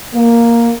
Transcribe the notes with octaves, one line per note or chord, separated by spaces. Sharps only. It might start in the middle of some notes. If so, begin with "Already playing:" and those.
A#3